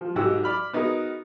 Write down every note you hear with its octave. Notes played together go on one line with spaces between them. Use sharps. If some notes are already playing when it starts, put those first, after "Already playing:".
F3
B1 G#2 F#4 G4 E6
D5 B5 F6
B3 D#4 F#4 G#4 A#4